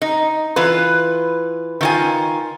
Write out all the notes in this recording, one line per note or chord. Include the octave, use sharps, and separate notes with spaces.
D#4
E3 F4 B4
D#3 F4 G#5